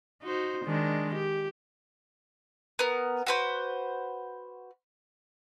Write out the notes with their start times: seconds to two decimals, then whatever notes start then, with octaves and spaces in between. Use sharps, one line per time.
0.22 D#4 F#4 C5
0.65 D#3 G#3 D4
1.15 G4
2.79 B3 A#4
3.27 F#4 B4 C5